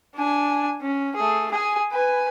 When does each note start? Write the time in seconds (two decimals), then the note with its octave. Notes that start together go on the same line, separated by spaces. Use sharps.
0.15 D4 G#5
0.81 C#4
1.16 A3 G#4
1.51 G#4 G#5
1.92 B4 G#5